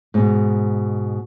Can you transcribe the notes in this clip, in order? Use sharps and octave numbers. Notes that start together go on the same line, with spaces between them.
G#2 B2